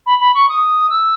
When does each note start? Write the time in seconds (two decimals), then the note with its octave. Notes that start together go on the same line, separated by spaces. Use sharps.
0.06 B5
0.20 B5
0.34 C#6
0.49 D#6
0.90 E6